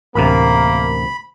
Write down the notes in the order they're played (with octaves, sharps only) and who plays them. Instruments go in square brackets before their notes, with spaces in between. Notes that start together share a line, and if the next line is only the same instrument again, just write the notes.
[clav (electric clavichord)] A1 D2 C3 [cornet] A#3 [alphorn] A#4 [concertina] B5